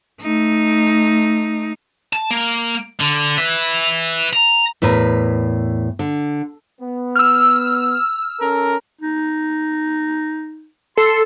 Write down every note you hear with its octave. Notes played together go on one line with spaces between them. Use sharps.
A3 D#4
A5
A#3
D3
B4 E5
A#5
E2 A2 A#4 B4
D3
B3
E6 F6
C#4 A4 A#4
D#4
A4 C6